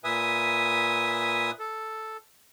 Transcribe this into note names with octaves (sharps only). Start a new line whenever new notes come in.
A#2 B4 E5 G#5 D#6
A4